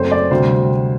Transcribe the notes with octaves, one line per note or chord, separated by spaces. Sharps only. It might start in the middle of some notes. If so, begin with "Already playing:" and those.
Already playing: F#1 F#2 F#3 A3 C4 C5
D5
D2 C3 G3 C5